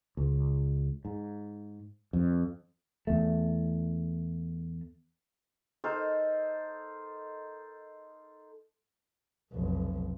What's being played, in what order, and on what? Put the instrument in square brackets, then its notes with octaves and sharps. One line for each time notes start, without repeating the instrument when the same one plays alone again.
[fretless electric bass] C#2
G#2
F2
E2 A3
[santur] D#4 A4 A#4 C5
[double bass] F1 B1